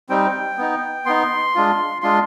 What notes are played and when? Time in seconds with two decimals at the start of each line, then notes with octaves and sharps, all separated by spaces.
0.09 G3 C4 D#4 G5
0.58 B3 D#4
1.06 B3 D#4 C6
1.55 G#3 D4 F4
2.02 G#3 D4 F4 C6